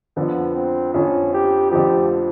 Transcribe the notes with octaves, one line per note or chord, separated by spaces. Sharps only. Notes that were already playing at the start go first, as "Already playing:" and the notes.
F2 D3 F3 B3
C4
F2 D3 F3 C#4
G4
F2 D3 F3 G4